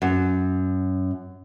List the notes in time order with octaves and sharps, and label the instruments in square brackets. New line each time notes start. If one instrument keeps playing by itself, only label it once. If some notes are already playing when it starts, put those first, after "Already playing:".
[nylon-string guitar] F#2